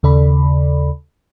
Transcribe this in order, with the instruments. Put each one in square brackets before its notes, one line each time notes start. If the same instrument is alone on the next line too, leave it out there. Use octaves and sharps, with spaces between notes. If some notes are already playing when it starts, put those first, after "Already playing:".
[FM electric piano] D#2 C#3 A4 D5 B5